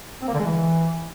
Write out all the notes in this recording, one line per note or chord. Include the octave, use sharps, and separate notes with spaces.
C4
A#3
D3
G#3
E3